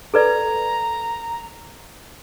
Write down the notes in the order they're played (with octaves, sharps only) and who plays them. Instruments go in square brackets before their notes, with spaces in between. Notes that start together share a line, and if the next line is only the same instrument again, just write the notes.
[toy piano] A4 B4 D5 [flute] A#5